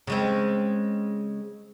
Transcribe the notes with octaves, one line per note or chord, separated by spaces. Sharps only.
C#3 G#3 C4